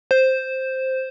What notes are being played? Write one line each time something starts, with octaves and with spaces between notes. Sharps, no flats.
C5